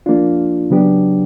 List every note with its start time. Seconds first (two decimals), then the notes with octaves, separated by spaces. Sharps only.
0.06 F3 A#3 D4 F4
0.70 C#3 F#3 B3 D4 G4